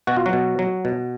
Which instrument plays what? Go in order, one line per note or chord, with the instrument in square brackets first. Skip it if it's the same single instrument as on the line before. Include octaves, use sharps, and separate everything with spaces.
[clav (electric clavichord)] B2 F#4
F4
F#3 F#4
B2
F#3
B2